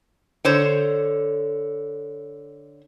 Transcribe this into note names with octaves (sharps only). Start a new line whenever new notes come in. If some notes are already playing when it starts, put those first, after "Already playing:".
D3 C5 C#5